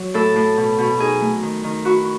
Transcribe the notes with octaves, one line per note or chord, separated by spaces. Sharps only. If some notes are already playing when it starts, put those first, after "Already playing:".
Already playing: F#3
A2 A4
A2
B2
B2
D#4 G#4
A3
D#3
D#3
E4 F#4